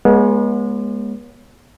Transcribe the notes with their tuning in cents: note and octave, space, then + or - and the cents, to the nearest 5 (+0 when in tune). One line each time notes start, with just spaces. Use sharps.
G#3 +0 B3 -40 C#5 +0